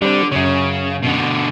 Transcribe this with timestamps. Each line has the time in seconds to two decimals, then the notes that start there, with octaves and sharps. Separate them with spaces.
0.02 D3 G3 C4
0.32 F#2 C#3 C#5
1.03 B2 D3